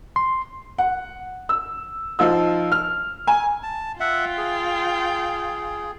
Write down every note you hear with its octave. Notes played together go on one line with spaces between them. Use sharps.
C6
F#5
E6
F3 D#4 F4 E6
F6
G#5
A5
F4 E5 F#5 G5
G#4